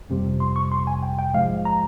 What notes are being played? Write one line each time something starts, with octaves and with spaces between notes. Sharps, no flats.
G1 F2 C3 G3
C6
C#6
C6
G#5
G5
G5
A#1 G#2 F3 G#3 F5
A#5